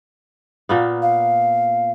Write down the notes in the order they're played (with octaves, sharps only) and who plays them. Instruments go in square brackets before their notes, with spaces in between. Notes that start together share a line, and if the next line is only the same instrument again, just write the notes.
[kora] A#2 A#3 B3
[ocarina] F5